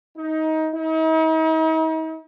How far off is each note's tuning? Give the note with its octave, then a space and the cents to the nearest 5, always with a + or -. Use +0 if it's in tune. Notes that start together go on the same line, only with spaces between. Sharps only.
D#4 +20
D#4 +45